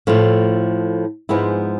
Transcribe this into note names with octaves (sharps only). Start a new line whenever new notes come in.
A2 F3 A3
G#2 F3 G#3 B3 E4